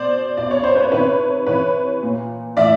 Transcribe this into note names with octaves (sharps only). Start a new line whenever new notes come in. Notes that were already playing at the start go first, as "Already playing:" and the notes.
Already playing: B2 C5 D5
B2 D5
C#5
C5
B4 C#5
C3 D#3 B4 C#5
C3 E3 B4 C#5
A#2
A2 E3 D5 E5